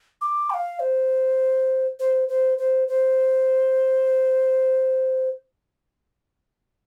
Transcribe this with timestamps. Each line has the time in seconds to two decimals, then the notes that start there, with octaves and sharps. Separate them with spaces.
0.21 D6
0.50 G5
0.54 F5
0.80 C5
2.00 C5
2.29 C5
2.58 C5
2.88 C5